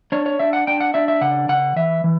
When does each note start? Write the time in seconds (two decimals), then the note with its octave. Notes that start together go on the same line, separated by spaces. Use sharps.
0.12 D4 C#5
0.26 C#5
0.39 D4 E5
0.53 F#5
0.67 D4 G5
0.80 F#5
0.94 D4 E5
1.08 E5
1.21 C#3 F#5
1.49 C#3 F#5
1.76 E3 E5
2.04 E3